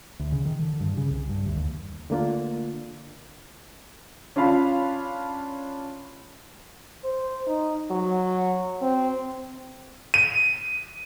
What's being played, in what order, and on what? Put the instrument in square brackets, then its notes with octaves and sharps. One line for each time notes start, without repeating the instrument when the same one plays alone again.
[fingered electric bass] D2
C#3
D#3
D3
G2
C#3
C2
G2
D2
D#2
[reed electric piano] D3 A3 A#3 D4 F4
[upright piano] C#4 D4 F4 F5 B5
[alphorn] C5
D#4
F#3
C4
[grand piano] D#7